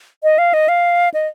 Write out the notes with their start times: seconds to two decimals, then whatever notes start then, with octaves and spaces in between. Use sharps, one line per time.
0.23 D#5
0.38 F5
0.54 D#5
0.68 F5
1.14 D#5